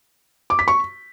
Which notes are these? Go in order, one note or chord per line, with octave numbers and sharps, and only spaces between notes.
D6
B6
C#6